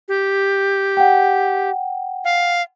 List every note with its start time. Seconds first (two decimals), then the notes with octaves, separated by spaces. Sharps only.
0.08 G4
0.97 F#5 G5
2.25 F5